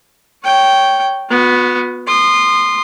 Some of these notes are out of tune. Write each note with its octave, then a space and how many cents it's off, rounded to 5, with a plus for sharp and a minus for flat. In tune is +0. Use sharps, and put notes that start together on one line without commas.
C#5 +0 G5 -10
B3 +0 F#4 -40
C6 +0 D#6 -30